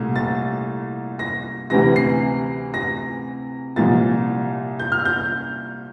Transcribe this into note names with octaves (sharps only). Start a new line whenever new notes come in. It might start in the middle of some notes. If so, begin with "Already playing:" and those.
Already playing: C2 A#2 A3
A6
A#6
D2 C3 E3 A#6
C7
A#6
C2 A#2 F3 A6
G6
F6
G6